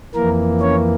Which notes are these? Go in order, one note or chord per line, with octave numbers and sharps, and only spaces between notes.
F2 E3 A#3 A#4
C#4 C#5